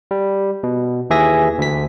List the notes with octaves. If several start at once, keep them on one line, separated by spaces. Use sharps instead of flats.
G3
B2
D#2 E3 G#4 E5 G#5 A#6
D2 B6